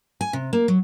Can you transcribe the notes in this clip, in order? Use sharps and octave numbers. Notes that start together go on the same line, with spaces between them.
G#5
C3
A#3
F#3